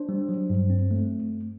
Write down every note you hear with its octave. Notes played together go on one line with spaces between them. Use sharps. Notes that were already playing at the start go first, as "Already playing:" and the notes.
Already playing: D4 C5
G3
F#3
G2
C4
A3